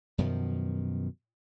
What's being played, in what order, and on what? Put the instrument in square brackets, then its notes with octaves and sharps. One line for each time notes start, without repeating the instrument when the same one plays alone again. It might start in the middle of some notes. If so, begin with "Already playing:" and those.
[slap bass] F#2 B2 D#3 F3